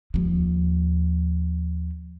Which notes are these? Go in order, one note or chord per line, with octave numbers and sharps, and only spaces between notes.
D#2 F3